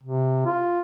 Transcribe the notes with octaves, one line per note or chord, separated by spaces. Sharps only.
C3
F4